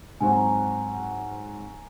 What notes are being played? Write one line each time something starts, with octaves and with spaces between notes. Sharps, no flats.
G#2 F#3 C4 F#4 G#5
A#5
G#5